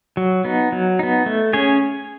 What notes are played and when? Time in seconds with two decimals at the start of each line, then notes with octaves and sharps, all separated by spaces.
0.17 F#3
0.45 B3 D#4
0.72 F#3
0.99 B3 D#4
1.26 A3
1.53 C#4 G#4 C#5